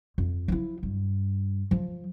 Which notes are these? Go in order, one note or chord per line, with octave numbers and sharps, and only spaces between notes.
F2
F3 E4
G2
F3